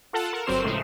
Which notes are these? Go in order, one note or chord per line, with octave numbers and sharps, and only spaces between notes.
F4 A4 F#5 A5
A#4
G1 F#3 C4 C5 C7 E7
A2 C#3 F3 G#3 A3